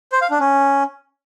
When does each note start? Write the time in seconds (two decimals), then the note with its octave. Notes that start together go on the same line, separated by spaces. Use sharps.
0.12 C5
0.21 F5
0.31 D4
0.40 C#4